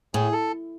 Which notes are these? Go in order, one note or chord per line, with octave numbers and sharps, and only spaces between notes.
A2 G#4
A4